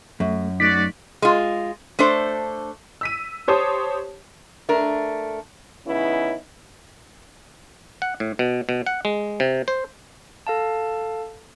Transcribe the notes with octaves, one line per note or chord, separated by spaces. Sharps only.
F#2 A3
F#3 A3 D#4 F#4 D5 B6
G#3 F4
A3 D4 A4 C5
E6 B6 D#7
G4 C5 C#5 A5 D#6
A3 D4 A#4
C#3 E3 B3 C#4 D#4 E4
F#5
A2
B2
B2
F#5
G#3
C3
C5
A4 F5 A5